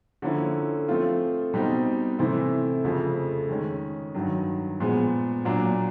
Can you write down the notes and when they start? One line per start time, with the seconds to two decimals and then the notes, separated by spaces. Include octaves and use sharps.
0.22 D3 F3 A#3 C#4 E4
0.88 F3 A3 C4 F4
1.53 B2 G3 C4 D#4
2.19 C3 E3 A3 C4 E4
2.85 F2 C#3 F3 A3
3.49 D#3 G#3 C#4
4.14 G2 D#3 F#3
4.80 A#2 F3 G#3 B3
5.45 A#2 F#3 A#3 D4